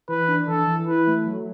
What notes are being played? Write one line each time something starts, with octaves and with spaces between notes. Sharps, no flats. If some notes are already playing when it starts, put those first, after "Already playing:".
E3 B4
D4
E3 A4
E3
E4 B4
A3
F#3